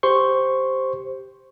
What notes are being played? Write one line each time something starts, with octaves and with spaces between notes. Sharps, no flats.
G4 C5 C6 C#6